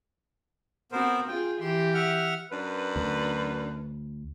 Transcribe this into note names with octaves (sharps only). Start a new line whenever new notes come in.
B3 C4 F#4 A#4 C5
F4 G#4 G5
E3 G4 C6
E5 F#5 F6
F#2 D4 B4
D2